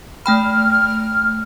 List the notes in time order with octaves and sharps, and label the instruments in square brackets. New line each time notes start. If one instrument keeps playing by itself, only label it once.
[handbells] A3 G5 B5 [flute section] F6